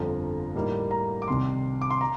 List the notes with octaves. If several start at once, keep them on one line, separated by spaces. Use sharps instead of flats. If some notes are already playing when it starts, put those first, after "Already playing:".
Already playing: G1 F2 D3 F3 A#5
A2 G3 A#3 D#4
A#5
D6
C2 C3 D#3 C6
D6
C6
A#5